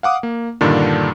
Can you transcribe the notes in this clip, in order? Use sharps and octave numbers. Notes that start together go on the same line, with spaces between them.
F5 F#5 D6 D#6
A#3
G2 A#2 D3 D#3 D4